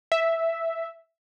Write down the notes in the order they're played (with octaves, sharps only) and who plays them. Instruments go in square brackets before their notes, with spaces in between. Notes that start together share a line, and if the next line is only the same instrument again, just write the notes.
[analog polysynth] E5